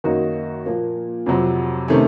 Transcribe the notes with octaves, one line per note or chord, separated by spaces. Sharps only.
F#2 D#3 A#3 D#4 F#4
A#2 F3 A#3
F2 C3 F#3
C3 D#3 A3 C#4